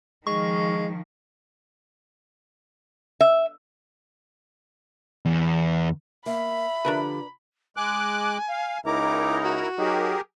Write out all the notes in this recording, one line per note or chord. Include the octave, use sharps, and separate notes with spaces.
D#3 F3 G#3 C#6
E5
E2
A#3 E5 B5
D3 F3 D4 G4 A#4 B4
G#3 G#5 D6 F#6
F5
C#2 D#4 E4 A#4 A#5 D6
F#4
F#3 D#4 G4 G#4 A#4